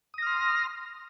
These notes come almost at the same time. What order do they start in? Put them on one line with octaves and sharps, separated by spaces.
D#6 A#6 F6 C6